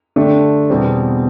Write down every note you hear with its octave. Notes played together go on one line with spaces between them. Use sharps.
D3 A3 D4 G4
E2 B2 G3 C4